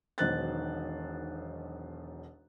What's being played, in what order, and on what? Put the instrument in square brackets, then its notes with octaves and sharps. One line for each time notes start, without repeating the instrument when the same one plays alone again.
[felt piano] E1 B1 D#3 C5 F#6 A6